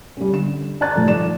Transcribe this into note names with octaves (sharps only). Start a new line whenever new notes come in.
G3 C#4
D3 E7
D5 A5 A#5 F#6 A6
A2 D#3 F3 G3 A3
F3 D5 E7